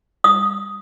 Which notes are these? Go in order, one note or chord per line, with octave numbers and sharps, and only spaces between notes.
D#6